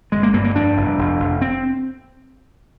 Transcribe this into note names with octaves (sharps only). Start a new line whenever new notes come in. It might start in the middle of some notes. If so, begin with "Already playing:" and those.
G1 G#3
A#3
G2 A#3
A#3
F2 D4
F1
F1
F1
C4